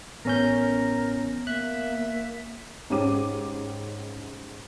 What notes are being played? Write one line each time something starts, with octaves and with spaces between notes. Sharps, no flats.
A1 B3 C#4 A#4 G6
A#3 E5 F#6
G#2 C#4 G4 D6 D#7